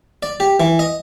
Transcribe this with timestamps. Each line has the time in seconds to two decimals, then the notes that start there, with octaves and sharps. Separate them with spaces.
0.23 D5
0.40 G4
0.60 E3
0.79 D#5